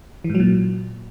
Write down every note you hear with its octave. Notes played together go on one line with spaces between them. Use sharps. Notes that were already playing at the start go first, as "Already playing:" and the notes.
E3
G#2
F#3
A#2